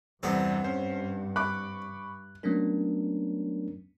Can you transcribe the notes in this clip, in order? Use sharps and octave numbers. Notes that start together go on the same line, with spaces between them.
E2 G2 C3 G3 B3 C4 A4
C#4 C5
B5 C#6 D6 F#6
F#3 A3 B3 C#4 D4 A#4